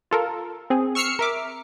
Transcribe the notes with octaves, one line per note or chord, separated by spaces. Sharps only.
F4 A4 A#4
C4 G#4
C#6 E6 F6 C7 C#7
A#4 E5 D6